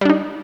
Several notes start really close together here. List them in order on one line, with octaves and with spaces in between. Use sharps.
G3 D4 D#4